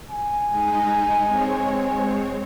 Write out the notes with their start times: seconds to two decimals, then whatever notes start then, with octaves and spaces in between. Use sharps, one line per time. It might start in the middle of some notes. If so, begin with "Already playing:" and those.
0.11 G#5
0.48 G#3 D#4
1.25 G#3 C4 C#5